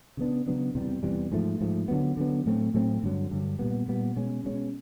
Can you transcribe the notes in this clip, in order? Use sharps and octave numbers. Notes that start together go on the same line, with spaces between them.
C#3 F#3 B3 D4
C#3 F#3 B3 D4
E2 C3 E3 G3
E2 C3 E3 G3
G#2 F3 A3
G#2 F3 A3
D3 F#3 B3
D3 F#3 B3
A2 F#3 A3 C4
A2 F#3 A3 C4
G2 D3 F#3
G2 D3 F#3
A#2 G3 B3
A#2 G3 B3
B2 G#3 C#4
B2 G#3 C#4